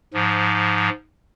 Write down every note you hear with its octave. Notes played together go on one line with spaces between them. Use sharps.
G#2 F3